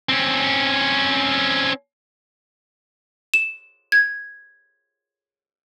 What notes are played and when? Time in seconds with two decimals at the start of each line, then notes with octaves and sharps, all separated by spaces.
0.09 C4 C#4
3.34 E7
3.92 G#6